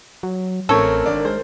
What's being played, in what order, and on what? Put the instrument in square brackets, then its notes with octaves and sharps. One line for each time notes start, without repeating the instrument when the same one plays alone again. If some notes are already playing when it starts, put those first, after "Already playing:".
[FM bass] F#3
[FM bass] A1 [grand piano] A3 C4 C#4 [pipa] A4 C#5 [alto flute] A#4
[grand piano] G#1 D4 D5
[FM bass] G#3 [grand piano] C5